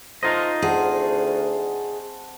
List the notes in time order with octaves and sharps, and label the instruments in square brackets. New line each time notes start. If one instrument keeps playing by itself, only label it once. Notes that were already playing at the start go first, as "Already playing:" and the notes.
[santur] A3 A#4 F5 [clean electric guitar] D#4 F4 D#5 [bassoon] C5
[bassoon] D2 [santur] C4 F#5 A5 [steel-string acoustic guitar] G#4